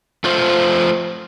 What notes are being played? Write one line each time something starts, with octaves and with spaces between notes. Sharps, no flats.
A3 F4 C5